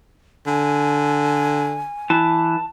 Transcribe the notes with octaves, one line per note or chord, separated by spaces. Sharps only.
D3 G#5
E3 A5